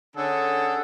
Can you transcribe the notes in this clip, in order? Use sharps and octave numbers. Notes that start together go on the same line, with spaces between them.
D3 C#4 G#4 A4